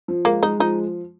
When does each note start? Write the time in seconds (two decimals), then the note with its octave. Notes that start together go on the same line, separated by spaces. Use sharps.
0.08 F3
0.25 G#3 A#3
0.43 G#3 D#4
0.60 F3 D#4